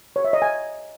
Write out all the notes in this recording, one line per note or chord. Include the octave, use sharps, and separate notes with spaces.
C#5
E5
D#5
G#5